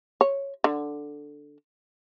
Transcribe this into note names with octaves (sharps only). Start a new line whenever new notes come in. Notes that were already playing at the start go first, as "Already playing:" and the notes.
C#5
D3